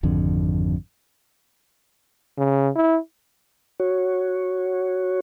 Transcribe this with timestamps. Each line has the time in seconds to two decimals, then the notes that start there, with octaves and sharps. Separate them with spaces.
0.03 G#1 F2 D3
2.38 C#3
2.75 E4
3.80 F#4 C#5